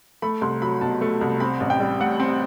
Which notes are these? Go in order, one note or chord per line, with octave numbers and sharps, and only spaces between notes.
A3 B5
C2 C6
F#3 B5
B2 A5
A3
C2
C4 B5
A1
G5
G3
A2 F#5
C4